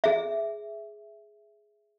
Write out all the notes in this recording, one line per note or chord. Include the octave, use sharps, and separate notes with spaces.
G#4 E5